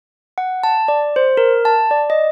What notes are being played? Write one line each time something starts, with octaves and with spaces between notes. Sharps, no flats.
F#5
A5
D5
C5
A#4
A5
D5
D#5